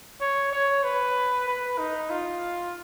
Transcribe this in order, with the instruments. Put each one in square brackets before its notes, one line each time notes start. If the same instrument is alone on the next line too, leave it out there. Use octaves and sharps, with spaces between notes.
[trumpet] C#5
C#5
B4
B4
D#4
F4